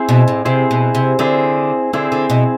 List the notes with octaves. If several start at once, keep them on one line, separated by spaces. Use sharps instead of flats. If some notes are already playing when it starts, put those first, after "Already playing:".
Already playing: C4 E4 G#4 C5
B2
A2
C3 C4 E4 G#4 C5
B2
C3
D3 C4 E4 G#4 C5
D3 C4 E4 G#4 C5
D3
B2